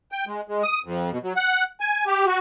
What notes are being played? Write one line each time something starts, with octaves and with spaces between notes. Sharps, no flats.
G5
G#3
G#3
D#6
F2
B2
F#3
F#5
G#5
G4
F#4